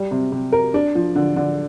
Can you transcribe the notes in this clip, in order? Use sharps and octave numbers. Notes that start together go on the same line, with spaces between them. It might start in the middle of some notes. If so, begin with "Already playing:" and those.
Already playing: G3
C3
C3
A#4
D4
F3
D3
D3